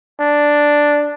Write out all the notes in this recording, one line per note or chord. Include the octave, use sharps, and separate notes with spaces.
D4